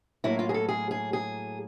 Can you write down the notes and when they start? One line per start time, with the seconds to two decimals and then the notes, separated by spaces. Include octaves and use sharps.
0.24 A2 F#3 A#3 E4
0.39 F4
0.49 G#4
0.54 A4
0.69 G#4
0.91 G#4
1.13 G#4